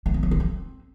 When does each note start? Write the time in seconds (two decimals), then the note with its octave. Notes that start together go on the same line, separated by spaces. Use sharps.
0.06 A3
0.14 B3
0.23 F3
0.31 B3
0.40 C4